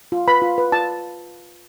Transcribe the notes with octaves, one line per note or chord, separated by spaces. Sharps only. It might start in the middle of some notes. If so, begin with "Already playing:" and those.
F4
B4 B5
F4
B4
F4 A5